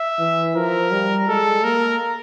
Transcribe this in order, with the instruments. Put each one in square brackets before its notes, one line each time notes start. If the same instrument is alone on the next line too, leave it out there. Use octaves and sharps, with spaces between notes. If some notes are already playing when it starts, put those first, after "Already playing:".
Already playing: [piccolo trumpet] E5
[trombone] E3
[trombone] F3 [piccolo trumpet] A#4
[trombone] G3
[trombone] G#3 [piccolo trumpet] A4
[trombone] A#3 [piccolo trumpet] A#4